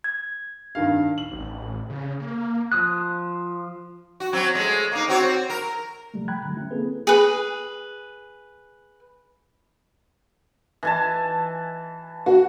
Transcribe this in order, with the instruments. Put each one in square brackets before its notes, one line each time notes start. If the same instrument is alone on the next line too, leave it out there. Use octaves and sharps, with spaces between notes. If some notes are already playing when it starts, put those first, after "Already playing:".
[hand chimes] G#6
[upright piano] G2 D#3 F5
F#7
[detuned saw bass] A1
C#3
A#3
[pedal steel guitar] F3 D#6 F#6
[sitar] F#4
F#3 C4 C#4
G#3 A3
A#3 D#4
C4 F#4 C#5
A#4
[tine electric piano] C3 F3 G3 A3
G5 A#5 B5 F#6 G#6
D3 F3 F#3 A3
C#4 E4
A#3 C4 G#4 A4 B4
[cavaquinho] G#4 B4
[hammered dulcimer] E3 G#5 A5
[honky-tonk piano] F#4